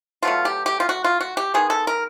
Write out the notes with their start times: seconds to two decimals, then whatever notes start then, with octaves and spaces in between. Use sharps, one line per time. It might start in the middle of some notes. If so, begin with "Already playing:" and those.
0.22 B2 F#3 A3 F4
0.45 G4
0.66 G4
0.80 F4
0.89 F#4
1.04 F4
1.20 F#4
1.37 G4
1.54 D#3 G#3 B3 G#4
1.70 A4
1.87 A#4